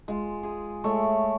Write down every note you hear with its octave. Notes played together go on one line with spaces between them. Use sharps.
G#3 F4
G#4
G#3 A3 C#5 E5